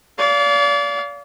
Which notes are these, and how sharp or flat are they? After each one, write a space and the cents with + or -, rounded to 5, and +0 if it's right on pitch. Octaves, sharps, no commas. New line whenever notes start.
D5 -35 F5 +0